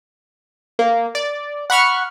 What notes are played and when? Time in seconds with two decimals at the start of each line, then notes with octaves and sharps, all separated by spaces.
0.79 A#3
1.15 D5
1.70 F#5 B5 C#6 F6